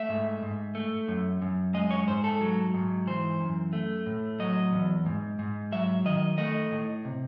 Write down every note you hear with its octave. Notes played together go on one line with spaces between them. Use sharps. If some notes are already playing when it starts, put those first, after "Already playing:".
Already playing: A3 E5
G#2
G#2
A3
F#2
F#2
G#3 D#5
C#5
G#2 C5
A4
F#3
G#2
E3 C5
F#2
A3
A2
F#3 D#5
E2
G#2
G#2
F#3 E5
D#3 D#5
A3 D#5
A2
C3